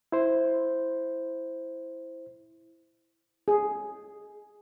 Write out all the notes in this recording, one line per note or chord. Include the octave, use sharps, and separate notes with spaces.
E4 C5
G#4